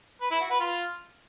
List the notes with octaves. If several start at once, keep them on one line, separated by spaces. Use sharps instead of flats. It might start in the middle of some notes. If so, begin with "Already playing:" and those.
B4
E4
F#4
B4
F4